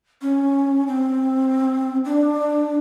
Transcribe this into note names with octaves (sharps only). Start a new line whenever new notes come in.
C#4
C4
D4